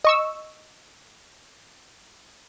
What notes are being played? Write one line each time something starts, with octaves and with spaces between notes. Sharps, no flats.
D#5 C#6 E6